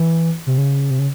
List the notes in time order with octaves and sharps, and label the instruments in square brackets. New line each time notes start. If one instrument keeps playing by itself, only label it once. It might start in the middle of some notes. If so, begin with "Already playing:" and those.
Already playing: [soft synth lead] E3
C3
C#3
C3
C#3